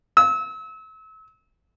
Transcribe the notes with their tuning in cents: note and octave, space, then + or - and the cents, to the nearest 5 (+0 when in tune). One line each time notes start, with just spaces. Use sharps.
E6 -35